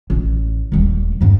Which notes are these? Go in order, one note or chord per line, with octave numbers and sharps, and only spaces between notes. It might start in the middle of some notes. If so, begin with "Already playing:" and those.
A1
D#1 G3
E2 G2